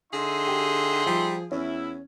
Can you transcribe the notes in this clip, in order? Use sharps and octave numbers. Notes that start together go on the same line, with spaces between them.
D3 D#4 G#4 E5 C6
G4
F3 G3
E2 C#4 E4